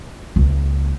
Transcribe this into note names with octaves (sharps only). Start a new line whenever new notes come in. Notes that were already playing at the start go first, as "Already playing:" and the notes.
C#2 A#3